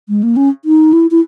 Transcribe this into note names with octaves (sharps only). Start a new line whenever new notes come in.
G#3
A#3
C#4
D#4
E4
E4